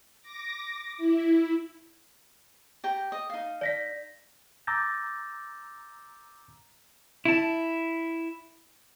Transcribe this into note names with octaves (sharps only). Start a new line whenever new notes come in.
D6 A#6
E4
G4 G5 A#5
D#5
D#4 F5
D5 A#6 B6
A#5 D6 E6 G6 A6 A#6
E4 A5